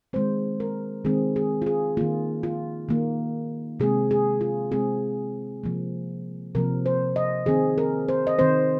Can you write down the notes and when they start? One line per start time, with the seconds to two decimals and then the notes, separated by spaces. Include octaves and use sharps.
0.13 D#3 G#3 C4 C5
0.60 A#4
1.05 D#3 G#3 C4 G#4
1.36 G#4
1.62 F4
1.66 G#4
1.97 D#3 A#3 F4
2.43 F4
2.89 D#3 A#3
3.80 C3 G#3 C4 G#4
4.11 G#4
4.41 F4
4.72 C3 G#3 C4 G#4
5.64 C3 F3 A#3
6.55 C3 F3 A#3 A#4
6.86 C5
7.16 D#5
7.46 D#3 C4 G#4
7.78 A#4
8.09 C5
8.27 D#5
8.39 D#3 C4 C5